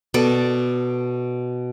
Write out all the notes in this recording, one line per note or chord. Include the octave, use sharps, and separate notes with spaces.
B2 A4 D5